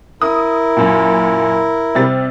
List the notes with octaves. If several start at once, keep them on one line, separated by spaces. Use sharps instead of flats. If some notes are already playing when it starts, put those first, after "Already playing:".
E4 A#4 D#6
F#2 A#2
C3 G3 A6